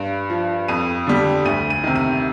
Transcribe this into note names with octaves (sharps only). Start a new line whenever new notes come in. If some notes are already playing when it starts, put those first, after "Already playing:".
Already playing: G2 D7
F3
F2 D#7
D3 G3
D2 D#7
D#7
C3 D#3
D#7